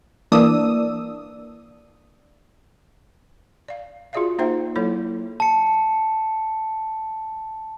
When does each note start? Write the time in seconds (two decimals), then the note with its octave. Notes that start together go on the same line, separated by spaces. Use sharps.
0.32 E3 A#3 D4 D5 D#6 E6
3.68 D5 F5
4.13 F4 F#4 G#4 D5 E5 F5
4.38 A#3 D#4 F4 C5 E5 G5
4.76 F#3 A#3 E4 A4 C#5
5.40 A5 C#7